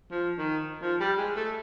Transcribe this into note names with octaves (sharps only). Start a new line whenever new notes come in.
F3
D#3
F3
G3
G#3
A3